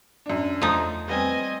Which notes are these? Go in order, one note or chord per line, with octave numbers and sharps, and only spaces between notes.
F#2 D4
E2 F3 A3 D#4
G3 B3 C4 D#5 G#5